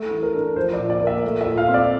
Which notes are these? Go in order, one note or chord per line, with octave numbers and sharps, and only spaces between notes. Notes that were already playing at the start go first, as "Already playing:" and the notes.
Already playing: A3
E3
A#4
D4
F3 C5
D5
A#2
D5
A#3
E5
A3
E5
A#2
F5
C4
D5